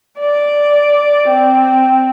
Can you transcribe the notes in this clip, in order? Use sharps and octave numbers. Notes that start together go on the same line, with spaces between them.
D5
C4